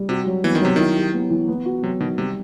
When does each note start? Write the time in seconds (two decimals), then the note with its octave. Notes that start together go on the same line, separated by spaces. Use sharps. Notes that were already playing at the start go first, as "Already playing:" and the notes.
Already playing: G3
0.09 C3 F#4
0.27 F#3
0.44 E3 B3
0.55 D#3
0.61 C3 F#3
0.76 D#3 E4
0.96 G4
1.13 B3
1.30 E3
1.48 B3
1.65 F#4
1.83 C3 F#3
2.00 B2 D#3
2.18 C3 G3